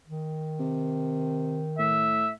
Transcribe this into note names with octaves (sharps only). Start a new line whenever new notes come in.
D#3
C3
A2 E5